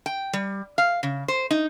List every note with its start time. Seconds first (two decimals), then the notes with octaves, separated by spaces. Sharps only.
0.06 G5
0.33 G3
0.78 F5
1.03 C#3
1.28 C5
1.51 D#4